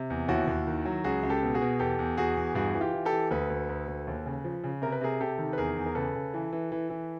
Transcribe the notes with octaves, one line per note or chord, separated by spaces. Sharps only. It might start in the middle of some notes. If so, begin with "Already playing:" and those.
Already playing: C3
E2
D#2 E4 F#4
D#2
D#3
F#3
C#2 F#4 G#4
C#2
G4 A4
B2
F#4 G#4
B2
E2 G4 A4
E2
E2 F#4 G#4
E2
G2 F#4 G#4
E3
F4 G4
E3
G4 A4
E3
D2 A4 B4
D2
D2
D2
D#2
C#3
F3
C#3
C3 A#4
B4
C3 G#4 A#4
C3 G4 A4
D#3
B4
E2 G#4 A#4
E2
A#4
C#3 A4 B4
C#3
E3
E3
E3
E3